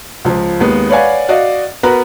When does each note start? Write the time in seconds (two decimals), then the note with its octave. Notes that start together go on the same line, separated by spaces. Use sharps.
0.25 C#2 F3
0.61 D#2 G#3 B3
0.90 B4 C#5 D5 F5 F#5 G#5
1.29 F#4 D5 D#5 F5
1.83 B3 F#4 A#4 B4 A#5 B5